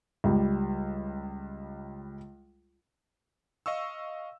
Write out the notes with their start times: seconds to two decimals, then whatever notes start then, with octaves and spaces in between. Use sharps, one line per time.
0.24 C#2 G3
3.66 D#5 F5 C#6 E6